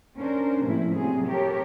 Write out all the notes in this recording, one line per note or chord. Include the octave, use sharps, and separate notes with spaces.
C#4 D4 A#4 C5
A2 C3 F3 A3 A#3 E4
C3 F#3 G3 C4 G#4
G4 A4 A#4 C#5